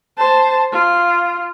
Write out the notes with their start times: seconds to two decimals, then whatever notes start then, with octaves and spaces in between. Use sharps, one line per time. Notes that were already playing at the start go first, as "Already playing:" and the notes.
0.18 C5 A5
0.72 F4